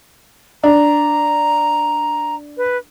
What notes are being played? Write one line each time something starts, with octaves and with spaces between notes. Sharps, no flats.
D4 A#5
B4